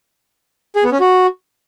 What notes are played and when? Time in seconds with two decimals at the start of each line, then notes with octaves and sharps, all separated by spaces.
0.76 G#4
0.84 B3
0.92 C#4
1.00 F#4